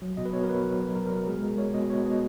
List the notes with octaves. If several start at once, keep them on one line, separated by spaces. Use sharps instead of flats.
F#3
B2 D#5
B4
B2 C#5
A#4
B2 B4
F#3
F#3
B2 A#4
A#4
B2
A#4
G#3 G#4
G#3 A#4
G#3 C#5
B2 D#5
B2 C#5
B2 D#5